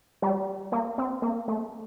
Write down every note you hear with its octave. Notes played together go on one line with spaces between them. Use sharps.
G3
A#3
C4
A#3
A3